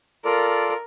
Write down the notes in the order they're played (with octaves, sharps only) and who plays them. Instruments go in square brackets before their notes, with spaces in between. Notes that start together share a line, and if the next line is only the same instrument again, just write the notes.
[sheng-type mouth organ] F4 A4 D5 [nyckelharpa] A#4